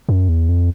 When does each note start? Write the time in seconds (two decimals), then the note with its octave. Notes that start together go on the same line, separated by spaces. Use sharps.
0.09 F#2
0.29 E2
0.49 F2